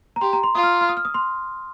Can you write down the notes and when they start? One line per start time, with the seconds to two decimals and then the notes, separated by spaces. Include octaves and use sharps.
0.16 A#5
0.21 G4 C6
0.33 A#5
0.43 C6
0.55 F4 D#6
0.63 F6
0.81 F6
0.89 D#6
0.97 F6
1.05 D#6
1.14 C6